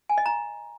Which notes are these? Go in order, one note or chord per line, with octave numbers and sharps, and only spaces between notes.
G#5
D#5
A#5